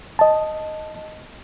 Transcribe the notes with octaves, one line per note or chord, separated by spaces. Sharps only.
D#5 A5